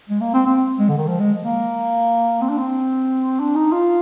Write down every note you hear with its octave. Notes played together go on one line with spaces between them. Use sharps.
G#3
A#3
C4
C4
G#3
D3
D#3
F3
G#3
A#3
C4
D4
C4
D4
D#4
F4